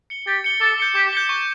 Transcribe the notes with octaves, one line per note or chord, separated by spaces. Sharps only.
C#7 G7
G4 A6
C#7 G7
A4 D6
G6 C#7 G7
G4 D6
G6 C#7 G7
C#6